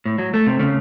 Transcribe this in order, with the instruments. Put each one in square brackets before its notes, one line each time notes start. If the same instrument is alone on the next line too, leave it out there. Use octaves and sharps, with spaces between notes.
[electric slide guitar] A2
F#3
A3
C3
C#3